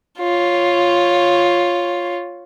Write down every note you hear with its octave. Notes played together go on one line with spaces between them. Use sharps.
F4 C#5